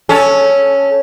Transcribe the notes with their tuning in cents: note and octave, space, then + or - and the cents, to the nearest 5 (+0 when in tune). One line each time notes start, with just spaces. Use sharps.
C#4 +0 A4 -10